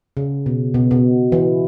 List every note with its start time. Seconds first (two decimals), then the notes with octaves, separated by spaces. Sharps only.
0.17 C#3
0.46 B2
0.74 B2
0.91 B2
1.32 E3